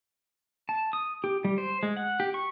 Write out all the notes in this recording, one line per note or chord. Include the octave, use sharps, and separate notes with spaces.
A5
D#6
G4
G3
C5
G#3
F#5
G4
C#6